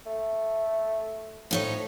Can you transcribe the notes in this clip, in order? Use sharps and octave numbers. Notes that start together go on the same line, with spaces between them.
A3
A2 F3 D#4 C#5